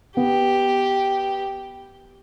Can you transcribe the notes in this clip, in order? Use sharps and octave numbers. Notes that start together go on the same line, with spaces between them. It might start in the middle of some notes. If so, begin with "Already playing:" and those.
B3 G4